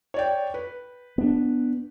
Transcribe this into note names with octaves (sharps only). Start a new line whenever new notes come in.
C#5 D5 G5
B4
B3 D4